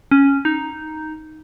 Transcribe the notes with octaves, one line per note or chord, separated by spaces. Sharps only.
C#4
D#4